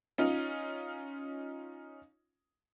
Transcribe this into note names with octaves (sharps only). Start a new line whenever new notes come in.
C#4 D#4 F4